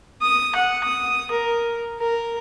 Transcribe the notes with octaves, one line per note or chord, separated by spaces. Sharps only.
D#6
F#5
D#6
A#4
A#4